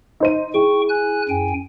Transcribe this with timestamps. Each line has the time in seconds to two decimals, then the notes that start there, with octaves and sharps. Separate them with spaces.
0.20 D#4 C5 D#7
0.54 E4 G#4 G5 C#6
0.89 G#5 F#6
1.29 F#2 G5 G#5